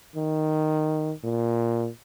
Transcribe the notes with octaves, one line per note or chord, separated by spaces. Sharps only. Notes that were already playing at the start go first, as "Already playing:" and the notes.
D#3
A#2